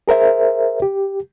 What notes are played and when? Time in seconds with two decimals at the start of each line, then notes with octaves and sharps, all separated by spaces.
0.08 G#4 A#4 C5 E5
0.82 G4